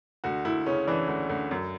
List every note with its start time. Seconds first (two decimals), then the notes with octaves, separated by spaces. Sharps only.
0.24 D2 F#4
0.45 D2 E4
0.66 C#3 C#4
0.87 E3 D4
1.08 D2
1.29 D2
1.51 F#2